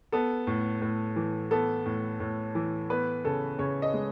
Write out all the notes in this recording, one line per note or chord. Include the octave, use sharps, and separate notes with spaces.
B3 A4
A2
A2
E3
B3 A4
A2
A2
E3
B3 B4
C#3 A4
C#3 C#5
D#5
G#3